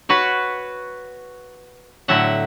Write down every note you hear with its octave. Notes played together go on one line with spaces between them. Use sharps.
F#4 B4 C#5
A2 D3 F#3 E5 F#5